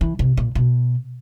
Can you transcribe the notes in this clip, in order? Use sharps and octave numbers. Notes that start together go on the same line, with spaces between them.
E3
C3
A#2
B2